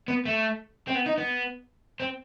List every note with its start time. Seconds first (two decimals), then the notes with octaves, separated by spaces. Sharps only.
0.08 B3
0.26 A3
0.88 C4
0.95 B3
1.06 D#4
1.18 B3
2.00 C4